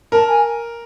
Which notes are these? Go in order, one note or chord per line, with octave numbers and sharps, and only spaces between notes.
A#4 A5
G#5